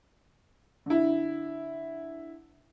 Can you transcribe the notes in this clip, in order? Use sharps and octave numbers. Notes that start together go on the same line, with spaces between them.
D3 E4